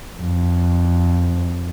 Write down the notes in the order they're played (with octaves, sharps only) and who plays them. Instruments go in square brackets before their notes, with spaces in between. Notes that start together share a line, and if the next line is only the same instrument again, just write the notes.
[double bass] F2